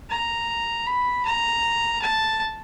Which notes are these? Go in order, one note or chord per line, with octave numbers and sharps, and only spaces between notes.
A#5
B5
A#5
A5